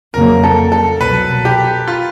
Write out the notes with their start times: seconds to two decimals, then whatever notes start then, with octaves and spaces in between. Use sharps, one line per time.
0.14 F2 C#3 F#3 A#3 A#4
0.44 A4
0.72 A4
1.01 C2 B2 F#3 B4
1.45 G4
1.88 F4